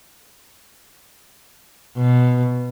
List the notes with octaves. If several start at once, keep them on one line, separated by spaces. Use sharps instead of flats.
B2